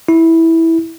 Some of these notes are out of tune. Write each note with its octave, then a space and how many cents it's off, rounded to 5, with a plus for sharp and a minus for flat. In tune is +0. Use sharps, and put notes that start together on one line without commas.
E4 -10